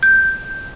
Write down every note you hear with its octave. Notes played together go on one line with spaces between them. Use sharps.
G6